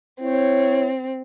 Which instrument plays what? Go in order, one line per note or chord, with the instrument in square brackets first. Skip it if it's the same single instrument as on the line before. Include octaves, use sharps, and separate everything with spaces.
[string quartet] C4 [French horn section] E4 C#5